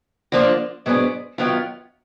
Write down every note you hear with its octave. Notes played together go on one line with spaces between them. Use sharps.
D3 F3 A#3 D4 F4
G#2 F#3 B3 D4 G#4
F#2 D#3 F#3 B3 F4